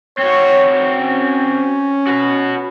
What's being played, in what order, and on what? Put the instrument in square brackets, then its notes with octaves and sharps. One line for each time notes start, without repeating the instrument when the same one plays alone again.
[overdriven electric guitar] C4 F#4 [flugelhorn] C#5
[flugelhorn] C#4
[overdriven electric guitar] F#4 B4